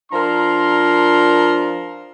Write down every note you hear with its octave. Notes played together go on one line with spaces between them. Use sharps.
F3 D4 A#4 A#5 C6